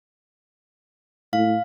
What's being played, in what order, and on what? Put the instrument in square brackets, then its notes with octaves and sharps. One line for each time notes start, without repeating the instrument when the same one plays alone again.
[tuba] A2 [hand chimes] F5